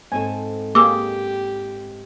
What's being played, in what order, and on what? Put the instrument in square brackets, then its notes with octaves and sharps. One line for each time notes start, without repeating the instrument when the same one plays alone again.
[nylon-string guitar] G#2 C4 A4 [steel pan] G#5
[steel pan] A#3 G#4 [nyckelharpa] G4 [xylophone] D6 E6